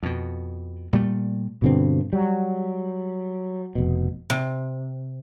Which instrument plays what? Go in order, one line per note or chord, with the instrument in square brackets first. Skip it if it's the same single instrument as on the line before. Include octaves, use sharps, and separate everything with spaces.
[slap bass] F2 B2
A#2 G3 A3
[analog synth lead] G2 [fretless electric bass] B2 D3 C4
[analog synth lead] F#3 [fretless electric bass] G3
[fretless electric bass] F1 B2
[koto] C3